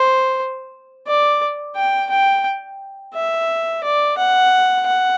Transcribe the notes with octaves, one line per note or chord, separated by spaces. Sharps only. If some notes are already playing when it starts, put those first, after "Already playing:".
Already playing: C5
D5
G5
G5
E5
D5
F#5
F#5